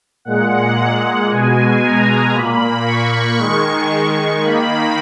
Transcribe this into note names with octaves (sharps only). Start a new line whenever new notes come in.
A#2 G#3 F#5
B2 G#3 G#5
A#5
A#2 A#3 B5
C#6
D#3 G#3
D#3 A#3 B5